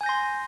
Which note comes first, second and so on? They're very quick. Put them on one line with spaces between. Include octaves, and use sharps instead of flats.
G#5 G6 A#6 C6